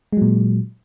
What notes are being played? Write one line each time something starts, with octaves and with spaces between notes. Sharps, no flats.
A#2 F#3 G#3